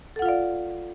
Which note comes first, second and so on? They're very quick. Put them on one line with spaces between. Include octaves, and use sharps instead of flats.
A4 F#5 F4 F5 D5